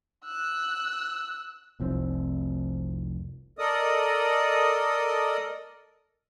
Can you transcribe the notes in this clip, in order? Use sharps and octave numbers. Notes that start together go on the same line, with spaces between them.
E6 F#6
F1 C2 C4
A4 A#4 D5 D#5 D#6